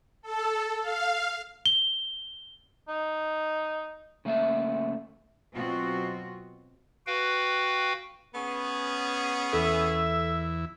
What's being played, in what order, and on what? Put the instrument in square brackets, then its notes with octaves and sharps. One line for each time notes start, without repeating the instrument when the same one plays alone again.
[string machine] A4
F5
[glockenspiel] G7
[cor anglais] D#4
[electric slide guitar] C#3 A3 A#3 E5
[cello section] B2 F#3 C4 F4 F#4
[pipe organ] F#4 B4 F5 G5
[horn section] B3 C#4 G#4
[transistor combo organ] E2 E4 [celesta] A4 [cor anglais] E5